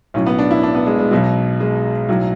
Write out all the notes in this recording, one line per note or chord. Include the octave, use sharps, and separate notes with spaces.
B1 A2 F#3 C#4
B3
D4
E4
D4
B3
G#3
G#3
B1 B2 F#3
G#3
B1 A2 F#3